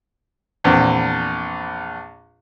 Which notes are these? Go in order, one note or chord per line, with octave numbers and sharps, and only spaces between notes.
A#1 E2 C4